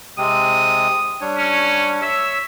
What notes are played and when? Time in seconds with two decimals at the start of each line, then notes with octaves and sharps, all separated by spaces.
0.18 C3 G#3 C4 D#6
1.21 G3 D4 C#5
1.37 C#4
2.02 C#5 E5 E6